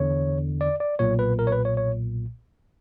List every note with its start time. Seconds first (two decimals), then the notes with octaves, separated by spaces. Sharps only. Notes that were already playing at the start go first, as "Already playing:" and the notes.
Already playing: E2 D3 C#5
0.61 D5
0.80 D5
0.99 B1 A#2 C#5
1.19 B4
1.39 A#4
1.47 C#5
1.52 B4
1.65 C#5
1.77 C#5